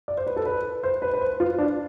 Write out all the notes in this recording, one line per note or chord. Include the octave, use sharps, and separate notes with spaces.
D5
C5
B4
A4
B4
C5
B4
B4
C5
F4
D4